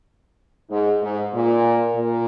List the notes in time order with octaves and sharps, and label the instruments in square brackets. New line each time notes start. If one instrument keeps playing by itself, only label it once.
[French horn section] G#2
G#2
A#2
A#2